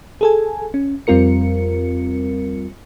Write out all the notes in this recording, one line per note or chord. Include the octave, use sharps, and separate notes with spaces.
G#4 A4 G#5
C#4
F2 G3 C4 F4 A#4 C#7